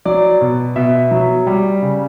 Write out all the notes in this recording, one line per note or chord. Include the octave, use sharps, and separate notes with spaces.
F#3 D5
B2
B2 E5
F#3
G3
C#3